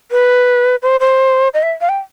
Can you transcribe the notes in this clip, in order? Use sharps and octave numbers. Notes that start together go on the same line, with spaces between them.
B4
C5
C5
D#5
E5
F5
G5